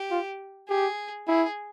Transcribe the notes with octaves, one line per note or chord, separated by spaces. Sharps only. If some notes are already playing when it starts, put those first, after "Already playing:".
Already playing: G4
F4
G4 G#4
E4 G#4